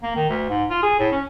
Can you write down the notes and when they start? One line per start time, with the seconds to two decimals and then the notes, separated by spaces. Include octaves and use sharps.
0.03 A#3
0.16 D#3
0.29 D2
0.49 G#2
0.70 F4
0.83 G#4
0.99 A2
1.12 C#4